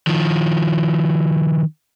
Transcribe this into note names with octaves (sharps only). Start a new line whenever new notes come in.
D#3 F3